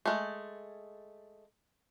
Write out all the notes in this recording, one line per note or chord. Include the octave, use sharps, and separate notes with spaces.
G#3 A3